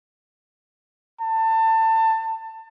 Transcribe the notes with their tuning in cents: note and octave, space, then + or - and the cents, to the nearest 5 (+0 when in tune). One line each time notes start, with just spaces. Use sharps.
A5 +25